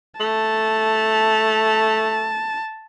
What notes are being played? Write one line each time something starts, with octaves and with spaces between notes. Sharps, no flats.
A3 A5